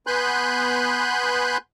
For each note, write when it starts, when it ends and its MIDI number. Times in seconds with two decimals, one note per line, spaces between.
0.07 1.58 59
0.07 1.58 80
0.07 1.58 83
0.07 1.58 84
0.07 1.58 90
0.07 1.58 91